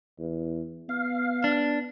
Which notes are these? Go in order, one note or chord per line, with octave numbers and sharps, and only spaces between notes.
E2
B3 F5
D4